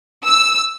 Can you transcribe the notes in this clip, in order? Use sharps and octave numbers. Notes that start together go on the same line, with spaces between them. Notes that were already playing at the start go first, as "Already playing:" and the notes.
E6